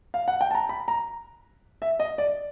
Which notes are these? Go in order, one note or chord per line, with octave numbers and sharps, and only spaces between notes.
F5
F#5
G5
A5
A#5
B5
A#5
E5
D#5
D5